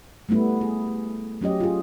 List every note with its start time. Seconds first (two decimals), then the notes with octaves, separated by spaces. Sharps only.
0.29 G3 A3 B3 E4
0.61 G#4
1.41 F#3 C#4 G4 D#5
1.60 F4 G#4